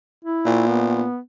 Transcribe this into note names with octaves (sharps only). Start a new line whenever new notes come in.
E4
A#2
B3